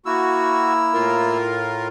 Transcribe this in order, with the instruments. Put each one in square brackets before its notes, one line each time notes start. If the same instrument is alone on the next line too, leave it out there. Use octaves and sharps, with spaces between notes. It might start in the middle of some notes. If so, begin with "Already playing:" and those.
[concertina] A#3 E4 E6 [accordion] F#4
[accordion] A2 F4 A#4